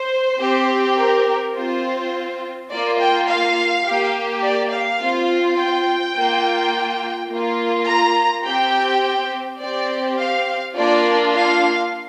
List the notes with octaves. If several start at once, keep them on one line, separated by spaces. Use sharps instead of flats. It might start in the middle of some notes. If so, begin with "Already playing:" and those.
Already playing: C5
C4 G4
A#4
C4 F4 C5
A#3 F4 D5
G5
F5
G4
A#3
D5
F5
C4 F4
G5
A#3 F4
A#3 F4
A#5
C4 G4 G5
C4 G4 D5
F5
A#3 D4 F4 D5
F5